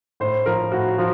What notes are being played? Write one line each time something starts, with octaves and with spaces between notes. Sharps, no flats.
A2 C5
F3 A#4
A2 F#4
F3